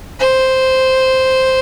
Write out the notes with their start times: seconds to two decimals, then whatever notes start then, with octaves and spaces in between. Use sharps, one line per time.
0.20 C5